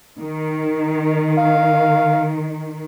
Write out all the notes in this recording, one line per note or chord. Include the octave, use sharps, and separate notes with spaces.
D#3
F5